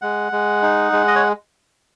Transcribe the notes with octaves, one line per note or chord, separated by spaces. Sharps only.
G#3 F#5
G#3
D#4
G#3
D#5
C#5